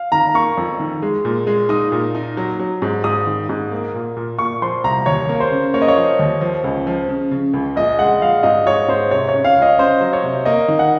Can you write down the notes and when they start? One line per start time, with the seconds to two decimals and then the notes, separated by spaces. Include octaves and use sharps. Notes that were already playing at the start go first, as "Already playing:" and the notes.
Already playing: F5
0.12 D#3 A#5
0.34 A#3 C#6
0.57 F2
0.80 D#3
1.02 G#3
1.25 A#2
1.47 G#3
1.69 D#4 D#6
1.92 A#2
2.15 D#4
2.37 F#3
2.59 F#3
2.82 G#2
3.04 G#2 D#6
3.27 D#3
3.49 G#2
3.72 A#3
3.94 A#2
4.17 A#2
4.39 A#2 C#6
4.62 F3 C6
4.84 C2 A#5
5.06 D#2 C#5
5.29 A#3
5.40 C5
5.51 C#3
5.74 A#3 C#5
5.82 D#5
5.88 C#5
5.97 F3
6.19 D#2
6.41 F3
6.64 C#2
6.87 F3
7.09 C#3
7.31 C#3
7.54 C#2
7.76 A#1 D#5
7.99 G#3 F#5
8.22 A#1 F5
8.43 G#2 D#5
8.66 G#2 C#5
8.88 G#2 C5
9.11 C3 C#5
9.29 C#5
9.34 C#4
9.44 F5
9.56 C#2
9.62 D#5
9.78 C#4 C5
10.01 F#3
10.13 C#5
10.24 C3
10.45 A#3 D#5
10.68 D#3
10.79 F#5